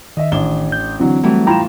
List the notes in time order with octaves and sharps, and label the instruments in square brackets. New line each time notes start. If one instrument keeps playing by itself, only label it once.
[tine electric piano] D#3 [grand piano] D#5 E5
[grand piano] A1 G7 [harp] D4
[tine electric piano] G6
[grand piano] D3 E3 F#3 [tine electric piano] C4
[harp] E3 G3 A3 [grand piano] F#3
[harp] A2 [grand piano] E3 F4 E7 [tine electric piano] G5 A#5 B5